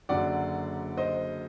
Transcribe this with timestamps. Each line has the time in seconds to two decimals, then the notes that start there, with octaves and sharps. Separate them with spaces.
0.09 F#1 F#2 D3 F#3 D5 F#5
0.97 C5 D#5